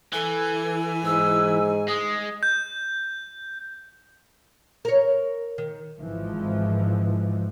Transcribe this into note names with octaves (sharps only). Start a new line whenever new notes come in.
E3 A4 G#5
G#2 E6
G#3 D#6
G6
A#4 C#5
D#3
G#1 E3 F3